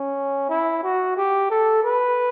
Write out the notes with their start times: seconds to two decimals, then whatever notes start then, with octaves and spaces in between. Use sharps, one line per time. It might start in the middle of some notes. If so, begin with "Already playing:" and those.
Already playing: C#4
0.49 E4
0.83 F#4
1.17 G4
1.50 A4
1.83 B4